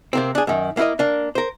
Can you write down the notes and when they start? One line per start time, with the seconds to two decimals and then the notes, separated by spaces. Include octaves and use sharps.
0.13 C3 A#3 C4
0.35 D4 G#4
0.47 F#2 D#3
0.77 A#3 E4 F4 A#4 D#5
0.99 A#3 D4
1.35 A#4 C5